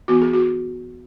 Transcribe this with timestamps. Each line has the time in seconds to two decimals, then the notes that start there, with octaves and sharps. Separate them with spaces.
0.08 E3 B3 F#4
0.22 G#4
0.33 F#4